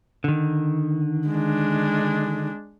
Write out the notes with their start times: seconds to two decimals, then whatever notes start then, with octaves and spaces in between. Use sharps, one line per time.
0.24 D3 D#3
1.28 G#3 D4